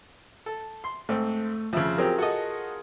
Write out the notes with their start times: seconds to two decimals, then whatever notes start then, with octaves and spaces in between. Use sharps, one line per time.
0.46 A4
0.84 C6
1.09 G#2 A3 C4
1.73 F2 C#3 F3 E5
1.98 F#3 C4 F4 G4 G#4 A#4
2.18 F#4 A4 D#5